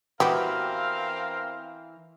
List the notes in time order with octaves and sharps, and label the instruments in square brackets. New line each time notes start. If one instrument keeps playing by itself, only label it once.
[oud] E3 F#4 [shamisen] B3 G4 [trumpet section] C4 A#4 F5